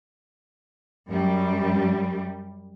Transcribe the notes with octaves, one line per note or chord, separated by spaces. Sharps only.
F#2 G3